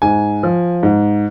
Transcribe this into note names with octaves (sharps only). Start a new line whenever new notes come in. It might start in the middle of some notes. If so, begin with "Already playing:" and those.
G#2 G#5
F3
G#2